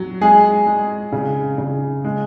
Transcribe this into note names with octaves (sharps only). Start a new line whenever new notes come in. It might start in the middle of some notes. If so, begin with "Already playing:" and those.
Already playing: F#3
G#3 G#4
G#3
C#3
C#3
G#3